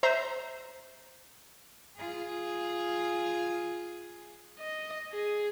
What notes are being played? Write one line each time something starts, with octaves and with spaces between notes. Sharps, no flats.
C5 E5 A#5 G6
F4 G#4
D#5
G#4